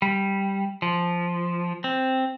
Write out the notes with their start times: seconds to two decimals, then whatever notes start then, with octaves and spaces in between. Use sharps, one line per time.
0.02 G3
0.82 F3
1.84 C4